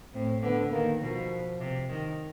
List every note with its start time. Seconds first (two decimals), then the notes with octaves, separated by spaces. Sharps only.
0.14 A2 C4
0.43 D3 B3
0.73 D#3 A#3
1.02 B2 F3
1.60 C3
1.89 D#3